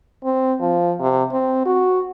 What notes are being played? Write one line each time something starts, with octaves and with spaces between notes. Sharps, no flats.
C4
F3
C3
C4
F#4